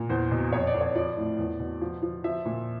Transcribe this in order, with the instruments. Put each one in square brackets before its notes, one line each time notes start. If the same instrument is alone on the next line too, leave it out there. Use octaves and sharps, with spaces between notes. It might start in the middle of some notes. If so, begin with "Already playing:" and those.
Already playing: [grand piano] A#2
E2 C5
B2
F2 C#5
D5
F2
C#5
F3 D5
A2
E2
B2
F3
F3
F3 E5
A#2